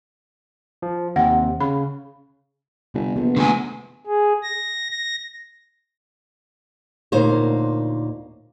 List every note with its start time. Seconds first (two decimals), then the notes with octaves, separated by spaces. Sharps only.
0.82 F3
1.16 D#2 C3 F#5 G5
1.61 C#3 B5
2.94 G1 C3
3.16 A#1 B3
3.37 D3 A3 G#5
4.07 G#4
4.43 A#6
4.90 A#6
7.12 D2 A#2 A#3 D#4 C5 C#5